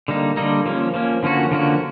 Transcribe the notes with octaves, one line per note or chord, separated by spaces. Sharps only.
D3 G3 A#3 D#4
D3 G3 A#3 D#4
F3 A#3 C#4
F3 A#3 C#4
D3 F3 A#3 C#4 F#4
D3 F3 A#3 C#4 F#4